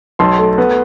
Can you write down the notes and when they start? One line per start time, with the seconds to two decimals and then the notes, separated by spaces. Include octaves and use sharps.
0.19 B1 A5 C6
0.39 A3
0.58 B3